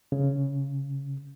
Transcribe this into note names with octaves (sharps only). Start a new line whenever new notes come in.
C#3